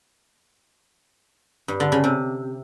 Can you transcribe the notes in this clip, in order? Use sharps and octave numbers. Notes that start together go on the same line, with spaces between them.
G2
D3
C#3
C3